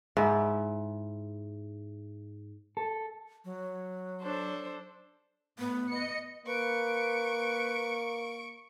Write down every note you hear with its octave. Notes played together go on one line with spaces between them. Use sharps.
G#2 E4
A4
F#3
D4 A4 C5
A2 B3
D#5 C#7
A#3 B4 C#6 D7